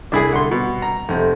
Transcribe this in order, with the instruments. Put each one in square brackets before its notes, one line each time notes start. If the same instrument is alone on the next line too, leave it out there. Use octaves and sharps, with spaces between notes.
[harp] C2 [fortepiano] D4 E4 G#4
[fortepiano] D3 C6 [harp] C#7
[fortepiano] B2
A#5
[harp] F1 C4